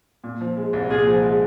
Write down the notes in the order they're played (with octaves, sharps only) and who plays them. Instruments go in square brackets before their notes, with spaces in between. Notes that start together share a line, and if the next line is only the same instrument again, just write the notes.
[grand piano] A#2
F3
G#3
C2
[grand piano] A#2 [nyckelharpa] G#4
[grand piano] F3
G#3